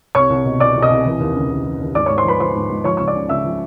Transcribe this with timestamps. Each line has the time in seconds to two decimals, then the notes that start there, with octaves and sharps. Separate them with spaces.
0.15 C2 C#5 C#6
0.30 C2
0.45 B2
0.60 B2 D5 D6
0.76 C2
0.82 D#5 D#6
0.90 C2
1.06 E3
1.20 D#2
1.35 C#3
1.51 D#2
1.65 E3
1.80 D#2
1.95 G#2 D5 D6
2.06 C#5 C#6
2.10 G#2
2.17 C5 C6
2.24 F3 B4 B5
2.40 F3 C5 C6
2.55 G#2
2.69 G#2
2.84 F3 C#5 C#6
2.97 C#2 C#6
3.08 D5 D6
3.15 C#3
3.29 C#2 E5 E6
3.45 F3